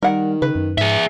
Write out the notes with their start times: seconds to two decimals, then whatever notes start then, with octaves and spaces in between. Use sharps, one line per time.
0.03 D#3 G3 A#4 F#5
0.42 C#3 B4
0.55 F#2
0.78 G#2 G#4 E5